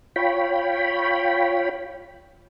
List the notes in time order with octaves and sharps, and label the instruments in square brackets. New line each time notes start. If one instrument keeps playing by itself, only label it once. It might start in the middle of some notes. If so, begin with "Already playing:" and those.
[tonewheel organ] F4 C#5 G5 B5